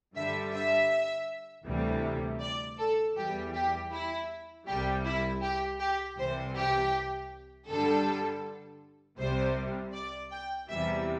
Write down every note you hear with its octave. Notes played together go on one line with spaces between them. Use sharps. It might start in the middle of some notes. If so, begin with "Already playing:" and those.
G2 D3 G3 E5
E5
D2 C3 E3 G3
D5
A4
E2 E3 G3 G4
G4
E4
C2 C3 G3 G4
E4
G4
G4
C2 C3 E3 G3 C5
G4
G2 D3 G3 A4
C2 C3 G3 C5
D5
G5
E2 C3 E3 G3 E5